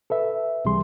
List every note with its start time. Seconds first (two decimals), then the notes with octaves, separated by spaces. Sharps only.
0.10 A4 B4 E5
0.65 C#2 C3 E3 G3 G#4 C6